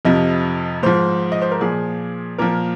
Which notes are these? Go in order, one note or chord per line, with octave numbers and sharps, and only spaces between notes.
F2 C3 F3 D#5
G#2 F3 C5
D#5
C5
A#4
A#2 F3 G#4
A#2 F3 A#4